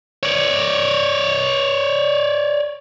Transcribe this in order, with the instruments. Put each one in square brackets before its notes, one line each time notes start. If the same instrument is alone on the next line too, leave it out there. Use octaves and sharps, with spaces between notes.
[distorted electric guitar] C#5 D5